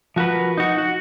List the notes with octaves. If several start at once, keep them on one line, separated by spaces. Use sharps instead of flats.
F3 F#4 A#4 B4
D#4 F#4
F#4